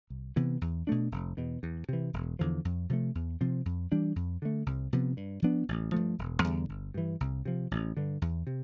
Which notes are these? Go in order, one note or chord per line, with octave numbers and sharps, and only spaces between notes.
C2
C3 E3 B3
E2
B2 A3 D4
F1
E2 B2
E2
C3 E3
E1
E2 D3 F3
F2
C3 F3 A3
E2
C3 F3 C4
F2
E3 G3 D4
F2
D3 A3
C2
C3 F3 B3
G2
F3 B3 D4
A1
G2 F3 A3
E1
E2 D3 G3
G1
G2 E3
C2
C3 F3
A1
G2 D3
E2
C3